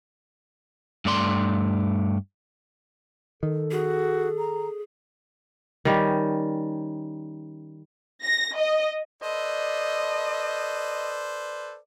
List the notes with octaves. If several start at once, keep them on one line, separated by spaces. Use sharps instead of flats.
G2 A3 D5 C6
D#3 A4
F#4 G#4
A#5
D#3 G3 C#4
A#6
D#5
A4 B4 C5 D5 D#5